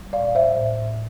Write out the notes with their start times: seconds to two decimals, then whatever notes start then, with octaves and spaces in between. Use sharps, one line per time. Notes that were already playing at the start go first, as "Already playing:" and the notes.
Already playing: G3
0.13 A2 D5 F5
0.35 C5 E5
0.57 A2